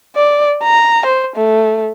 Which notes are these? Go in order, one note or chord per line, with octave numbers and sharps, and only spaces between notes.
D5
A#5
C5
A3